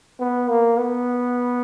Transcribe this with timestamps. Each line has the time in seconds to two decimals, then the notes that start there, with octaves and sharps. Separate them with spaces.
0.20 B3
0.49 A#3
0.79 B3